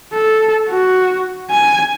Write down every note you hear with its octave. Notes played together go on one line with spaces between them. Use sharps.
A4
F#4
G#5